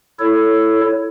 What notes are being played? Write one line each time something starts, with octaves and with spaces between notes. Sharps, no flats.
E4 A4 C#5